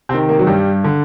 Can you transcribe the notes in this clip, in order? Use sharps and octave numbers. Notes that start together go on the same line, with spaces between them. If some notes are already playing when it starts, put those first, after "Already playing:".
C3 D#3 C4
A#3
F#3
G2 G3
D3